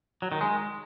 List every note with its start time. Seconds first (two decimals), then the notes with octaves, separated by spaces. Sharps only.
0.22 F#3
0.32 D#3
0.41 G#3